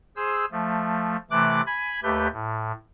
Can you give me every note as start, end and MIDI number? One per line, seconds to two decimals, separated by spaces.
0.16 0.45 68
0.16 0.45 72
0.16 0.45 88
0.52 1.16 53
0.52 1.16 57
1.31 1.61 48
1.31 1.61 52
1.31 1.61 57
1.31 1.61 86
1.31 1.61 90
1.67 2.00 80
1.67 2.00 83
1.67 2.00 92
2.03 2.28 39
2.03 2.28 57
2.03 2.28 67
2.03 2.28 71
2.03 2.28 91
2.33 2.72 45